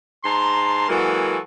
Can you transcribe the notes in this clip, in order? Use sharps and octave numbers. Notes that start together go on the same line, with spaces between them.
G#2 A5 A#5 C6
E3 F#3 G#3 A#3 F#4 A4